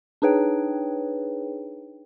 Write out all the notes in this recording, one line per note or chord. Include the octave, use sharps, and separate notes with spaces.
D4 D#4 G#4 B4 C#5 G5